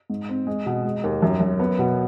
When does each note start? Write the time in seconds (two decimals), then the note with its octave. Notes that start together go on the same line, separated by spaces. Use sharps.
0.10 G#2
0.29 C4
0.47 G#3
0.66 B2
0.84 G#3
1.04 D#2
1.22 F#2
1.40 F#2
1.60 B3
1.79 B2